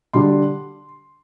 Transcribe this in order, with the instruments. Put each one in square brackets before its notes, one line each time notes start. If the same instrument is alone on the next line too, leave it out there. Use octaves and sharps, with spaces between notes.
[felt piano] D3 G3 D4 C6